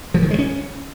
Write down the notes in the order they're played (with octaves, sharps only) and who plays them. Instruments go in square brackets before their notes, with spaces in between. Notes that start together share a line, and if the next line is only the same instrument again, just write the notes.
[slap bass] F3
D#3
G#3
C#4